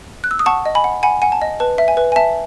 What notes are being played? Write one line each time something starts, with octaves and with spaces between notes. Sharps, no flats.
F#6
E6
D#6
F#5 A5 C#6
D#5
G#5 B5
F#5
F#5 G#5 B5
F#5 G#5
A5
D#5
B4 A5
E5
G#5
B4
G#5
E5 A5